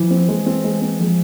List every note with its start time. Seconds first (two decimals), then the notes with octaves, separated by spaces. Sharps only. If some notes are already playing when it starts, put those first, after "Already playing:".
Already playing: E3 F3
0.11 C4
0.28 E3 G#3
0.46 C4
0.64 G#3
0.82 C4
0.99 F3 G#3